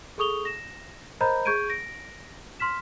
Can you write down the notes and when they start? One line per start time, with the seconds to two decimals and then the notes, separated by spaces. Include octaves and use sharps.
0.18 G#4 A4 C#6 D#6 F7 G7
0.45 A#6 E7
1.21 A#4 C5 D#5 A#5 B5 G6
1.45 G#4 C#6 G6 G#6 D7 D#7
1.70 A#6 D7
2.60 C6 F6 B6 E7